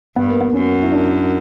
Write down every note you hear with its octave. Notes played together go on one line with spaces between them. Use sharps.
G2 B3
A#3
B3
F#2 C#4
E4
D4